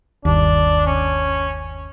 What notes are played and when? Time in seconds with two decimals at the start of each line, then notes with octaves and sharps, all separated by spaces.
0.25 G1 D#2 D4
0.86 C#4